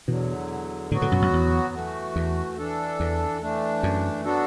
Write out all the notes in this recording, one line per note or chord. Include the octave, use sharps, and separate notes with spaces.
E2 B2 D3 E3 F#3
A2 D3 F#3 B3 F#4
A2 D3
F#2 B2
F#2
E2
E3 A3 F#4
E2
E3 D4 A4
E2
E3 A3 D4
F#2
F#3 B3 D4 F#4 A4